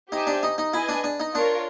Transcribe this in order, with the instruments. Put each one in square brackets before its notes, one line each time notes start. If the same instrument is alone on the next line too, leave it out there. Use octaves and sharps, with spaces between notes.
[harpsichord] D#4 [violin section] G4 C5 E5 G#5
[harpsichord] D4
D#4
D#4
[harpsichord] E4 [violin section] G#4 B4 D#5 G#5
[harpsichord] D4
D4
D#4
[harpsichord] D4 [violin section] F4 A#4 C#5